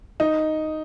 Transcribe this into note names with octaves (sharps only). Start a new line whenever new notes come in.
D#4